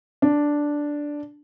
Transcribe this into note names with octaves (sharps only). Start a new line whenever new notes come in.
D4